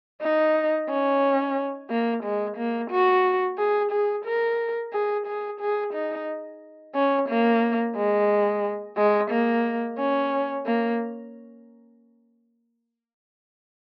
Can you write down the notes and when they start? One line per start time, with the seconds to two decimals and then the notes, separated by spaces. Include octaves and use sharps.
0.21 D#4
0.89 C#4
1.90 A#3
2.23 G#3
2.57 A#3
2.90 F#4
3.58 G#4
3.92 G#4
4.25 A#4
4.93 G#4
5.26 G#4
5.60 G#4
5.94 D#4
6.95 C#4
7.28 A#3
7.96 G#3
8.97 G#3
9.31 A#3
9.98 C#4
10.65 A#3